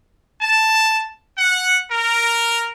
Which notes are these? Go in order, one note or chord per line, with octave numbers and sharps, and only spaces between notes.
A5
F#5
A#4